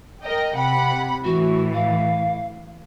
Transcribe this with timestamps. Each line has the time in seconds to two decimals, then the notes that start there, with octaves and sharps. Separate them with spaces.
0.22 A#4 D#5 G5
0.56 C3 F#5 G5 B5
1.24 A2 E3 F#4
1.74 F5